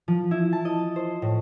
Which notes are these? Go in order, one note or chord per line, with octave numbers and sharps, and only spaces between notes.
F3
E4
A5
D#5
C5
A2